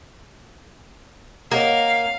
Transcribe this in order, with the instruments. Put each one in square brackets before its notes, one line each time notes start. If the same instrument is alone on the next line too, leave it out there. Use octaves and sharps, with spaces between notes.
[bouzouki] A#3 [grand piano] C#5 D#5 F#5 [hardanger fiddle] F5